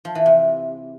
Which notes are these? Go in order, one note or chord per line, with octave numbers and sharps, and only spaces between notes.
F3
E3
C3